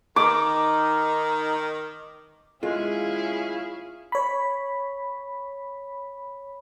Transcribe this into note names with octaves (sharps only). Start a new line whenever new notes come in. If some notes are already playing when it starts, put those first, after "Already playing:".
D#3 D#4 D6
G#3 C#4 E4 F4 G#4 F5
C#5 B5